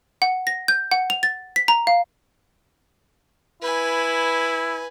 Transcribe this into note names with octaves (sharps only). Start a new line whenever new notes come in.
F#5
A#6
G6
F#5
F7
A6
B6
A#5
F5
E4 B4 G#5